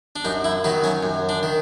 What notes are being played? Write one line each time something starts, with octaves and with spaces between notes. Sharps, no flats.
D4
F#2 D#4
E4
D#3 F#3 D#4
C#4
F#2
D4
D#3